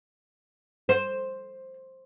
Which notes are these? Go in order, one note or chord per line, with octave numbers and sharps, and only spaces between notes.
C5